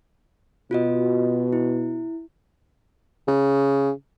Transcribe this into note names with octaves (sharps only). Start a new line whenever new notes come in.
B2 F4 F#4 D#5
E4
C#3